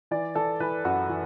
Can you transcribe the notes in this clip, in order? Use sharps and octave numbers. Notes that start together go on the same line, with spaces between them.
E3 D5
E3 A4
E3 B4
F#2 F#4
E3